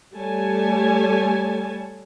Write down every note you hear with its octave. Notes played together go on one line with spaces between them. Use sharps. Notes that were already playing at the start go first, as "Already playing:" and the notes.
G3 A3 C#5 G#5 A5